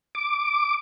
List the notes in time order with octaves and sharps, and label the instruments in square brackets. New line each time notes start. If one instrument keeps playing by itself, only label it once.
[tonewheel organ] D6